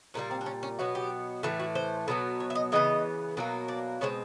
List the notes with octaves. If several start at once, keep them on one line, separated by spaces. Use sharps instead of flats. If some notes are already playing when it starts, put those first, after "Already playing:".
A#2 G3 A#3 C#4
C4
D4
C#4
C#4
B2 F#3 B3 F#4
G4
A2 E3 A3 F#4
F#4
C5
B2 F#3 B3
C#5
E5
D#5
C#3 E3 B3 D#5
B2 F#3 A#3
D5
B2 G#3 C4 C#5